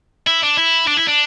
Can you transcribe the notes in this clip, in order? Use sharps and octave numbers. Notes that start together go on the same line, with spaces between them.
E4
D4
E4
D4
E4
D4